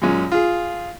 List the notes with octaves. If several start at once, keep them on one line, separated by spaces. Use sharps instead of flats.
F#2 A#2 G#3 C#4
F4 G#4